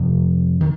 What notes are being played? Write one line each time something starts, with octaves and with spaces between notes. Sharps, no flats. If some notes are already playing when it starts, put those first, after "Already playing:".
Already playing: F2 C3
D#3